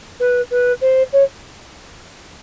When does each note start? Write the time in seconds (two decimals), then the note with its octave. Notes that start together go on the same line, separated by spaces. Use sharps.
0.20 B4
0.50 B4
0.81 C5
1.12 C#5